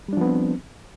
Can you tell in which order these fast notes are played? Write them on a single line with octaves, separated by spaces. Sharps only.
G3 D4 F3 B3 C4